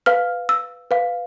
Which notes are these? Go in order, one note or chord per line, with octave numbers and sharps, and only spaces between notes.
B4 F5 F6
E6
B4 F5